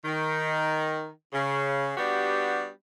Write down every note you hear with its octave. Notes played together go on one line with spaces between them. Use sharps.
D#3
C#3
G3 B3 D4 F#4 G4